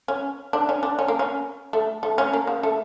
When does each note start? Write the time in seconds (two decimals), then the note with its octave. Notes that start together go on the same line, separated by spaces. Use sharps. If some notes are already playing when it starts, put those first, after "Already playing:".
0.08 C#4
0.53 D4
0.69 C#4
0.83 D4
0.99 C#4
1.08 A#3
1.19 C#4
1.73 A3
2.03 A3
2.18 C#4
2.33 A#3
2.47 C#3
2.63 A3